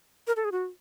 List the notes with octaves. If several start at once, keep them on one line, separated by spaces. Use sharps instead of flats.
A#4
A4
G#4
F#4